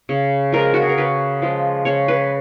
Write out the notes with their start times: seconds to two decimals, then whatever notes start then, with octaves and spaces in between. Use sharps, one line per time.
0.09 C#3
0.52 F3 G#3 A#4
0.74 F#4
0.82 G#4
0.89 A#4
0.98 C#3 B4
1.42 F3 G#3
1.85 C#3 C#5
2.08 B4